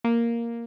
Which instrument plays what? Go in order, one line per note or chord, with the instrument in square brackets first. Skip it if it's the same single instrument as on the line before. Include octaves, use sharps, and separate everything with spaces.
[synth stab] A#3